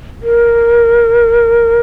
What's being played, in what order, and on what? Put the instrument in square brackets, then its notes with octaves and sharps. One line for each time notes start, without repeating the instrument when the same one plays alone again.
[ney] A#4